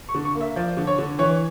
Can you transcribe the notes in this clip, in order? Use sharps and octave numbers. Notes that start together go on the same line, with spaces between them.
C#6
D3
C#6
A#3
E5
F3 D5
D3
C#5
D3
E3 C#5